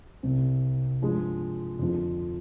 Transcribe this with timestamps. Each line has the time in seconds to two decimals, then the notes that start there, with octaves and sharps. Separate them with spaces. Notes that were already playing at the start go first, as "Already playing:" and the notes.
0.23 C2 C3 G3 C4
1.02 G2 F3 G#3
1.79 F2 D3 F3